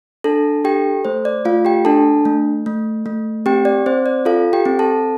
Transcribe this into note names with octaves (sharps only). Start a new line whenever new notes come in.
D4 A4 A5
G4 A4 G5
A3 C5
D5
A3 F4 F5
G4 G5
D4 A4 A5
A3
A3
A3
C4 G4 G5
D5
C4 C5
D5
F4 A4 F5
G4 G5
C4
A4 A5